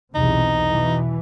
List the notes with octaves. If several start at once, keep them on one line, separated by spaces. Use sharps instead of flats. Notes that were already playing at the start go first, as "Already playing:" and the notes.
B1 E2 C3 D#4
B2 E3